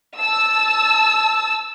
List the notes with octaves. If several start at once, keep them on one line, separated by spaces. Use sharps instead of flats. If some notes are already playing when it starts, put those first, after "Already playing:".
A5 E6